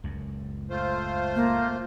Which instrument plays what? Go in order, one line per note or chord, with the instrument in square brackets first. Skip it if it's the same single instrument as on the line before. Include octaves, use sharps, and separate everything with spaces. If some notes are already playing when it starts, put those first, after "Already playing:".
[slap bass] C#2 F#2
[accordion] A3 F4 C5
[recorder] A#3